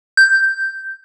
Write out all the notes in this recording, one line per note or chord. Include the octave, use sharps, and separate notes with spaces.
G6